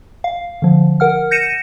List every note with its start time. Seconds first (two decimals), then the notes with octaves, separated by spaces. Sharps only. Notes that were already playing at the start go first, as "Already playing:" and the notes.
0.24 F5
0.62 D3 F3
1.00 A#4 F#5 F6
1.31 G6 A#6 C#7 D#7 E7